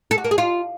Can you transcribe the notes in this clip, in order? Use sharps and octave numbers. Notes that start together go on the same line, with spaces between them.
A4
F#4
A#3
G#4
F4